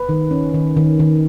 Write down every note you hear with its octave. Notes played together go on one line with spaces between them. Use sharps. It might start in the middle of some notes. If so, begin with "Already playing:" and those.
Already playing: B4
D#3
C#4
D#3
D#3
D#3